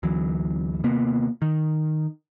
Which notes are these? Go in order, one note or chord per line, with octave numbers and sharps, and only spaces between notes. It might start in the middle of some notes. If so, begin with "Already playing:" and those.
D2 E3 F#3
D#2 C3 A#3 B3
D#3